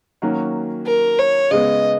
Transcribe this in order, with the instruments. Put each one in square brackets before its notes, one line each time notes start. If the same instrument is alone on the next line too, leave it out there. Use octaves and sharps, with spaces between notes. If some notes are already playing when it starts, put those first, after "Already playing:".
[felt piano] D#3 F#3 A#3 C#4 F#4
[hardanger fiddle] A#4
C#5
[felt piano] C#3 G#3 B3 [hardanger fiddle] D#5